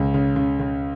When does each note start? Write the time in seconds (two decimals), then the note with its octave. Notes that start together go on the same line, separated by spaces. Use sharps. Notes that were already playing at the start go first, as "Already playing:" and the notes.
Already playing: C#2 C#3
0.14 C#3
0.36 C#3
0.59 C#3